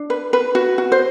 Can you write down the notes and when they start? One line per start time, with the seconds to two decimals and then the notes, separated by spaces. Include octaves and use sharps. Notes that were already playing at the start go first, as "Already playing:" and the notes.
Already playing: D4
0.10 B4
0.33 B4
0.55 F#4
0.78 F#4
0.92 C5